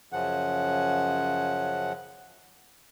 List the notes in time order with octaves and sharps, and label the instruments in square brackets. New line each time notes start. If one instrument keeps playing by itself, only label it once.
[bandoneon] F#2 C#3 F3 F#5